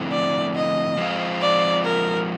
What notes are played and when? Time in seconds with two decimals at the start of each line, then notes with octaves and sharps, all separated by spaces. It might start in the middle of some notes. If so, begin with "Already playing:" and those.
Already playing: D3 F3 A3 C4 E4
0.11 D5
0.55 D#5
0.97 F3 G#3 C4 F4
1.41 D5
1.84 A#4